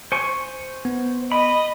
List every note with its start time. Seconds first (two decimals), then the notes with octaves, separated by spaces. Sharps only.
0.12 C5 G#5 C#6 C#7
0.85 B3
1.32 D#5 B5